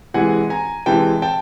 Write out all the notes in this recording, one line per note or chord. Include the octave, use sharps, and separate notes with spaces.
C3 E3 G#3 F#5 G#5
G#5 A#5
C3 E3 G#3 G5 A5
G5 A5